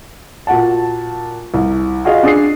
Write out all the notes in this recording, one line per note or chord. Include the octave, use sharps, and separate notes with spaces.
A#2 F#4 F#5 A5
C2
F4 F#4 G#4 D#5 F5
D4 G#4 D#6 C7